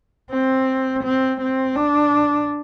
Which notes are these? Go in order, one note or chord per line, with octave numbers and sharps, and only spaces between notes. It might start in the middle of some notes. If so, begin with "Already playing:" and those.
C4
C4
C4
D4